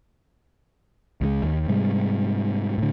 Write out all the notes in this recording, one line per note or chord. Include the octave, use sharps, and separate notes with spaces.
C#2 F3 G#3
D#2
G#2 C3 G3 G#3
A2 D3